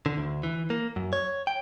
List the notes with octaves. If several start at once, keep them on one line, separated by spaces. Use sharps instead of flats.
D3
D2
E3
A#3
F#2
C#5
G5